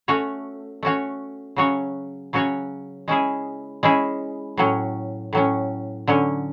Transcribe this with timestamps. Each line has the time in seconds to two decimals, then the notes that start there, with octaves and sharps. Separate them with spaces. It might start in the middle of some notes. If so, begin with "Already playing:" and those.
0.08 A3 C#4 F#4 C#5
0.83 A3 C#4 F#4 C#5
1.56 C#3 F#3 C#4 F#4 C#5
2.33 C#3 F#3 C#4 F#4 C#5
3.08 G#3 C#4 E4 G#4
3.83 G#3 C#4 E4 G#4
4.57 A2 F#3 C#4
5.33 A2 F#3 C#4
6.07 D3 F#3 C#4